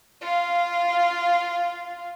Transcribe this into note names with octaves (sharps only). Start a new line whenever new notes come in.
F4 F5